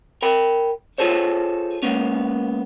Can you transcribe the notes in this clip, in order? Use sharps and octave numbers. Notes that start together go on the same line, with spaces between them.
A#4 G5 B5
F4 G#4 A4 C5 C#5
G#3 A#3 B3 C#4